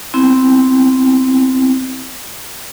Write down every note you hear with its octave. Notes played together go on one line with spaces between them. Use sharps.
B3 C4 E4